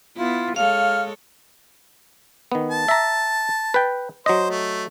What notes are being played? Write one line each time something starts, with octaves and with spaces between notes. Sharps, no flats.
B3 E4 F4
G#3 A4 C#5 F5 F6
D#3 B3
A5
E5 A#5
B4 G5
F#3 C5 D#5
A3